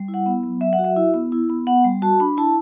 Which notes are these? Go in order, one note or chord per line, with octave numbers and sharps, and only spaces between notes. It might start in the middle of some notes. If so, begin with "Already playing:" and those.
Already playing: G3
E4
F#5
B3
F#3
F#3 E5
F#5
F#4
E5
E4
B3
E4
B3
B3 F#5
G3
F#4 A5
D4 B5
E4 A5